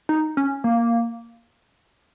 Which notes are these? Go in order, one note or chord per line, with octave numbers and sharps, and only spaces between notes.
D#4
C#4
A#3